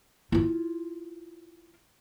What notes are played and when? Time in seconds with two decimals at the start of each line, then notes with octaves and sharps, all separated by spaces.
0.32 E4 F4